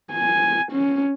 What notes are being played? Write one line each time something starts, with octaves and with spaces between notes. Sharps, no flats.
G#5
C#4